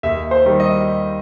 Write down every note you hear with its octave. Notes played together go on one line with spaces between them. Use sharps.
D#2 E5
C5
D#3 G3
D#5